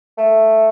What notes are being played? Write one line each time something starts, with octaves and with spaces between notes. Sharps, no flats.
A3